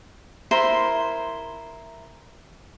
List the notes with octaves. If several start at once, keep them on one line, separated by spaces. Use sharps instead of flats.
E4 A#4 C5 C6